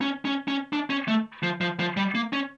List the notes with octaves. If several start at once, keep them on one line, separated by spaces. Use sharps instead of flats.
C#4
C#4
C#4
D4
C#4
A3
F3
F3
F3
G3
A#3
C#4